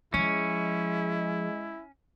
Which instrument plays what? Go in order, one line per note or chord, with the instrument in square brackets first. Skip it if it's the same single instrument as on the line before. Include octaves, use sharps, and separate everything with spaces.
[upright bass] F3 [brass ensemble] G#3 [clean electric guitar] C#4 [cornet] E4